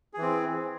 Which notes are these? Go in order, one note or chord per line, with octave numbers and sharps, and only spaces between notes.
E3 C4 G#4